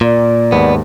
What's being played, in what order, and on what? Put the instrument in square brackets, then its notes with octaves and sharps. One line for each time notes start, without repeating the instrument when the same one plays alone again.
[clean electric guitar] A#2 [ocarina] D5
[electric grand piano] D#2 G#2 [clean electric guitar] B3